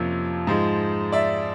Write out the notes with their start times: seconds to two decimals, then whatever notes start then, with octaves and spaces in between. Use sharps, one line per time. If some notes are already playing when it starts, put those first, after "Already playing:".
Already playing: F2 C3 F3 A#3 C#4
0.47 G#2 F3 G#3
1.12 D5 E5